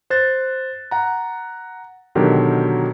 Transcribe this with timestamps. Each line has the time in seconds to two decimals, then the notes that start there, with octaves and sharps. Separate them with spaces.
0.10 C5 F#6 A6
0.91 F#5 A#5
2.15 B2 D3 D#3 F#3 G4 A#4